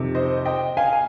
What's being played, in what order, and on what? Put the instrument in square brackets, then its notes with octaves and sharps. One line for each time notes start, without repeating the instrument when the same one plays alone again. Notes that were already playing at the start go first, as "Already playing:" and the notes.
Already playing: [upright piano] F2 C3 D#3
C5 D#5
D#5 G5
F5 G#5
G#5